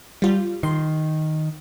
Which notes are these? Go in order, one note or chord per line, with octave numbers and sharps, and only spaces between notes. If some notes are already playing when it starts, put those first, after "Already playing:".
G3 F4
D#3 C6